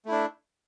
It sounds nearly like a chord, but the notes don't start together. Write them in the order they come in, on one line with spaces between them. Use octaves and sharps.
A3 E4 D4